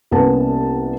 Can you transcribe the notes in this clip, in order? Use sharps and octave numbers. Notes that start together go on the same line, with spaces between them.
C2 A#3 B3 C#4 B4 A5